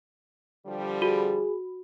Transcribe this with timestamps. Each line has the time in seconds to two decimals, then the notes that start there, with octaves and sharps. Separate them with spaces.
0.67 D3 F3 G3
1.02 F#4 G#4